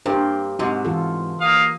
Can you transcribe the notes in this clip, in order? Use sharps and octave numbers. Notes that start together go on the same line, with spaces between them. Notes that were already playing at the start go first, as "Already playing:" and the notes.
G2 G4 A#4 C5
G#2 C3 F#4
E3 F4 A4
A#3 F5 D#6